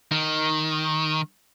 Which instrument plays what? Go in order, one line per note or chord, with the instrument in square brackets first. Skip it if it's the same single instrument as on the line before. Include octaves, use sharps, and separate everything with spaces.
[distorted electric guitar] D#3